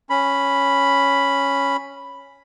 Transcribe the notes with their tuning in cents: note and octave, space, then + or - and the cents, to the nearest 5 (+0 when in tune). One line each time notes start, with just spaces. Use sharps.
C#4 +0 B5 +0